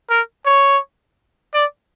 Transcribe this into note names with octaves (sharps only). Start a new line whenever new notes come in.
A#4
C#5
D5